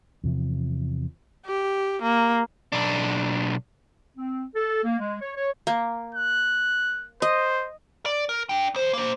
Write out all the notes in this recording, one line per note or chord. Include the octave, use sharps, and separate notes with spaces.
E2 C3 F3
G4
A#3
B1 D4
C4
A4
A#3
G#3
C#5
C#5
A#3
F#6
C5 D#5
D5
A#4
D4 G5
B1 C5
A#3 C5